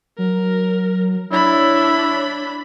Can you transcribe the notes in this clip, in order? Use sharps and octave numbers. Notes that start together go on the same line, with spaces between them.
F#3 A#4
D4 E4 C#5 B5